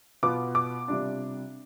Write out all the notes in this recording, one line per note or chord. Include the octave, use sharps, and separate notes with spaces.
B2 B3 F4 D6
D6
C3 G3 D4 F4